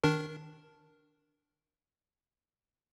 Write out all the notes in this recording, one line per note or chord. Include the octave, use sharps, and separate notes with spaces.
D#3 D4 A#4